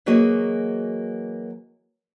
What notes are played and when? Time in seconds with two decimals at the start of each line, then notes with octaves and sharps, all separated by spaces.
0.06 E3 F#3 A#3 F#4 G#4 D#5